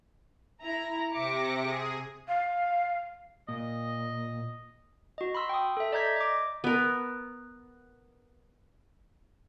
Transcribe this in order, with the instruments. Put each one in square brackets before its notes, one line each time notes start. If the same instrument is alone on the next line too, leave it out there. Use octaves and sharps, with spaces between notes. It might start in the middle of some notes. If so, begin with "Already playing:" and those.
[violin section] E4 A#5
[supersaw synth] C3 A#6 [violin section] E5 D6 C#7
[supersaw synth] G#4 D#6
[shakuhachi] F5
[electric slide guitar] A#2 [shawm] D#5
[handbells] F#4 D#5
B5 C6 E6
G5 D#6
A4 E5
D5 D#5 A#5 G6 G#6 B6
D#5 D6
[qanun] B3 A#4